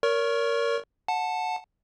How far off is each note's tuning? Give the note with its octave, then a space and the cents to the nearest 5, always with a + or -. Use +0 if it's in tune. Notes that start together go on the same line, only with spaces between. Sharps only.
A#4 +0 C#5 +35 C#6 -15
F#5 -20 A5 +0